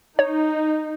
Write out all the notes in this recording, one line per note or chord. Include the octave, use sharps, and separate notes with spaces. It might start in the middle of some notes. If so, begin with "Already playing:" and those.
D#4 C#5